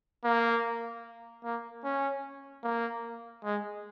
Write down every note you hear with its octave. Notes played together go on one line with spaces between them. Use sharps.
A#3
A#3
C#4
A#3
G#3